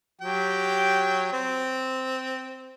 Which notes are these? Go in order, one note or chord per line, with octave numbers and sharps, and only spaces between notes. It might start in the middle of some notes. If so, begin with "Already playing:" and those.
F#3 G4 G5
C4